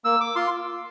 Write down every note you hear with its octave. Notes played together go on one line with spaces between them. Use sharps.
A#3 E6
D6
F4 C6